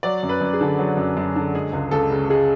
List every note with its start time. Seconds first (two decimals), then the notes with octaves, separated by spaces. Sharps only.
0.03 F#3 D5
0.23 F#2
0.29 B4
0.41 F#2
0.53 G#4
0.61 D3
0.79 F#3
0.97 F#2
1.17 F#2
1.36 D3
1.54 G#3 G#4
1.73 C#2
1.91 C#2 A4
2.11 C#3
2.30 G#3 G#4